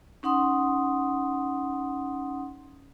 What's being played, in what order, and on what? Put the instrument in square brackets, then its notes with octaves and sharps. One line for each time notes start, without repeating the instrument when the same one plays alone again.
[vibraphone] C#4 D#4 F#5 C6 D#6